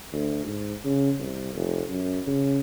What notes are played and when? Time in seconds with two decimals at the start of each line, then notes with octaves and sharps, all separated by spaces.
0.13 D2
0.46 G#2
0.84 C#3
1.19 C2
1.55 F1
1.89 F#2
2.27 C#3